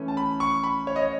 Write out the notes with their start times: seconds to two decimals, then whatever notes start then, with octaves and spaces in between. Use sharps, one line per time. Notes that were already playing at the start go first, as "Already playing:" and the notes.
Already playing: E3 A3 C#4
0.08 A5
0.17 B5
0.40 C#6
0.63 B5
0.87 C#5
0.96 D#5
1.02 C#5